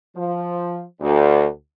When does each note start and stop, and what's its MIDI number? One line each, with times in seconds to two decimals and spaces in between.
0.16 0.82 53
1.01 1.47 38